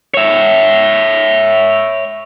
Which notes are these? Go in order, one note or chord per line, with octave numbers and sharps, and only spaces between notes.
C#5 E5